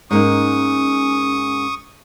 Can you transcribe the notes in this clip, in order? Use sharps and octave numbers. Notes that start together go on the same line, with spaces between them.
G#2 A#3 C#4 D#4 C#6 D#6